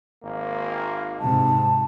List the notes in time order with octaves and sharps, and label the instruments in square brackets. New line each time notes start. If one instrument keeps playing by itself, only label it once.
[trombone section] G#1 A#3
[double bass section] G#2 C3 [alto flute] A5